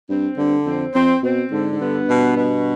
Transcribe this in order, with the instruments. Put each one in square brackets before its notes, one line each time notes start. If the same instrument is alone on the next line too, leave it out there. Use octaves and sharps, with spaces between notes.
[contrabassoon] G2 [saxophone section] C4
[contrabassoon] G2 [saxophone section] D3
[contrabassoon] F2 [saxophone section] C4
[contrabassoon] F2 [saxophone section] C4
[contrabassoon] B2 [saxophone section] C4
[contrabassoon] G#2 [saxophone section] D3
[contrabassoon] G#2
[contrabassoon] G2 [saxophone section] B3
[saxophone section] B2
B2